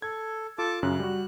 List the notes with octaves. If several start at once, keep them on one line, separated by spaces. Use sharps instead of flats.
A4 G#6
F4 A4 A5 D6
F#2 C#3 F#6
G3 F#4